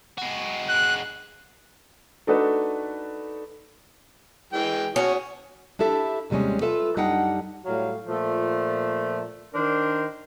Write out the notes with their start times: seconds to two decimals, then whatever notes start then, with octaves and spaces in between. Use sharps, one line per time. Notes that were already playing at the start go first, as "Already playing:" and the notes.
0.18 G#3 F#4
0.69 F#6
2.27 A3 D4 D#4 F#4 A4 B4
4.53 E3 G#3 G5
4.96 C#4 F#4 D#6
5.79 D4 E4 G4 A4 E5
6.30 D#2 C3 G3 G#3 C#4
6.61 F4 A4 B4 E5
6.96 F#2 G3 D4 D#4 F#5 G5
7.66 A2 F#3 G3 F5
8.08 A#2 F3 A3
9.53 D#3 D4 A#4 C5